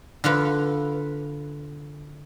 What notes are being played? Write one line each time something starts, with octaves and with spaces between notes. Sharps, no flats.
D3 F4 B4